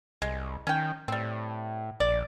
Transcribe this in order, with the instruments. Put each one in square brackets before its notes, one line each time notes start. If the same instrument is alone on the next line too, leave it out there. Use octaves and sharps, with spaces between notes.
[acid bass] C2 [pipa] G#3
[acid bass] D#3 [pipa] C#4 G5
[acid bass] A2 [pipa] G3 C4
[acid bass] A#1 [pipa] D5